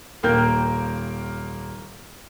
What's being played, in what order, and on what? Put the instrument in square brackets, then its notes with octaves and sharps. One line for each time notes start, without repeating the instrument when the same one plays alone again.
[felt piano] D#1 A#3 A#4 G5 G6